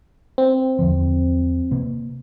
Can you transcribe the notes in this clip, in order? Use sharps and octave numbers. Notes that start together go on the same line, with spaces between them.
C4
E2 D3 F3
C3 A#3